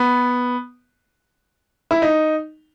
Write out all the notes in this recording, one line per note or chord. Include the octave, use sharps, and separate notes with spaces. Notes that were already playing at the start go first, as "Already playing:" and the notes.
Already playing: B3
E4
D#4